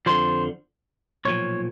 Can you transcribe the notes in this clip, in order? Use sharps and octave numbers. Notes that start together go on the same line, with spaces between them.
F2 D3 F3 C5
B1 A#2 F3 C#5